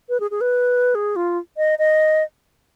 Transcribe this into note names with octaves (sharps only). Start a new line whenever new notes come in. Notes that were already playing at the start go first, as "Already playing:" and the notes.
B4
G#4
G#4
B4
G#4
F4
D#5
D#5